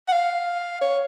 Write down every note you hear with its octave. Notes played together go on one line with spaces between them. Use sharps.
F#5
F5
C#5